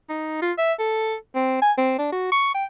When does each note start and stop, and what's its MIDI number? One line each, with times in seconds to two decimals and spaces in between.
0.09 0.40 63
0.42 0.53 65
0.58 0.73 76
0.79 1.16 69
1.35 1.61 60
1.62 1.72 80
1.78 1.95 60
1.98 2.10 62
2.12 2.31 66
2.32 2.54 85
2.55 2.65 79